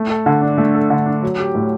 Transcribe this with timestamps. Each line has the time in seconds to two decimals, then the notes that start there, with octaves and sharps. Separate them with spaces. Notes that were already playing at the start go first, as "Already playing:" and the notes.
Already playing: A3
0.09 A4
0.26 D3
0.41 D4
0.58 A3
0.75 A4
0.90 D3
1.06 D4
1.22 F#3
1.39 G4
1.55 A2